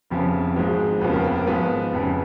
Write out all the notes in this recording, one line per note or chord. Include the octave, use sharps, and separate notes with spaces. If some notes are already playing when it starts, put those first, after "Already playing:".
F1 F2 C#3 F3 B3
G#1 G#2 F3 G#3 B3
F1 D#2 C#3 F3 B3 B4
A#4
B4
A#4
G#1 G#2 F3 B3 B4
F1 F2 C#3